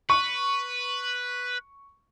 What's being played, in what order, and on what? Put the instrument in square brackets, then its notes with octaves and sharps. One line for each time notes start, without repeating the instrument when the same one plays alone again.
[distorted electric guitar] B4 [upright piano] C#6